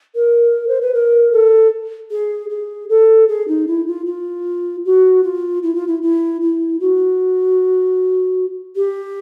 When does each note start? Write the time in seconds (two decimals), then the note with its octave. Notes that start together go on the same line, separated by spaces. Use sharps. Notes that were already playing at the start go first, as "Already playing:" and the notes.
0.15 A#4
0.68 C5
0.81 B4
0.94 A#4
1.32 A4
2.11 G#4
2.49 G#4
2.89 A4
3.28 G#4
3.47 D#4
3.67 E4
3.87 F4
4.06 F4
4.85 F#4
5.23 F4
5.63 E4
5.75 F4
5.87 E4
6.02 E4
6.41 E4
6.80 F#4
8.75 G4